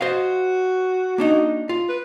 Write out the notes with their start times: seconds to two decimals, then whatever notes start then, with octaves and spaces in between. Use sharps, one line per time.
0.01 F#4 C5 D#5 F5
1.18 A#3 D4 D#4
1.69 F4
1.89 B4